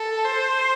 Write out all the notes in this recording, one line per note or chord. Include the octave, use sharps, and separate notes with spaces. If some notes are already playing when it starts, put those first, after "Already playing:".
Already playing: A4
C5